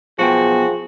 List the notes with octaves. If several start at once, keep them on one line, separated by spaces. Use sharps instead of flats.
B1 B2 F3 F#4 G#4 G5